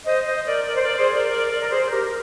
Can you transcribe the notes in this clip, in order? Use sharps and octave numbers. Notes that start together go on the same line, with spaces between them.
C5 D#5
C5 D#5
A#4 D5
A#4 D5
C5
A#4 D5
G#4 C5
A#4 D5
A#4 D5
A#4 D5
A#4
G#4 C5
C5
G4 A#4
A#4